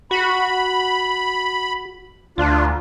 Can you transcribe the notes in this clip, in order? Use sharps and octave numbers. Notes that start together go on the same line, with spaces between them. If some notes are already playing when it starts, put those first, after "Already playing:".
F#4 B5
D2 D4 F4